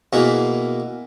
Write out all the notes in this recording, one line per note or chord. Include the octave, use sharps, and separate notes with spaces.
B2 E3 A#3 B3 G#4